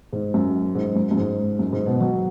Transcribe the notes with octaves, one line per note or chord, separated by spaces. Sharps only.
G#2
F#2
G#2
F#2
F#2
G#2
F#2
G#2
B2
F#3